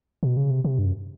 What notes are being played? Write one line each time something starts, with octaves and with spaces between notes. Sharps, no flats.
B2
C#3
C3
C3
G2
F#2